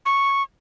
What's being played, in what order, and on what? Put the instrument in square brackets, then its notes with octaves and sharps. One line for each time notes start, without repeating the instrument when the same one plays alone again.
[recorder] C#6